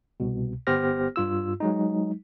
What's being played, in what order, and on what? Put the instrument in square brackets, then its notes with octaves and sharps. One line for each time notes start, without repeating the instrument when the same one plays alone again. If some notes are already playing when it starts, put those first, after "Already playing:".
[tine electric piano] C2 B2
G1 B3 G4 C5 F6 A#6
G2 F4 E6
F#3 G#3 D#4